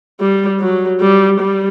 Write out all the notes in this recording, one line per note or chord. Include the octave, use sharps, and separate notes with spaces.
G3
F#3
G3
G3